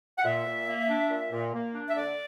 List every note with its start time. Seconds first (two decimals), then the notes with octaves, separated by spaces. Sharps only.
0.18 F#5
0.25 A#2 E5
0.46 A#2
0.67 A#3
0.89 D4
1.10 A#2
1.32 A#2
1.54 A#3
1.74 D4
1.89 E5
1.96 D3 D5